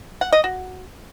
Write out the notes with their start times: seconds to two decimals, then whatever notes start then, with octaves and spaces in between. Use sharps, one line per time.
0.21 F#5
0.33 D#5
0.44 F#4